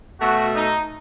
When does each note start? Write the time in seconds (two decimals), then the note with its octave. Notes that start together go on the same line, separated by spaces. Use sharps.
0.20 B2 A3 F#4
0.55 D#4